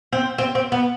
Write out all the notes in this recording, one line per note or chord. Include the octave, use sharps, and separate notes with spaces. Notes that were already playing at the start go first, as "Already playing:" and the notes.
C4
C4
C4
B3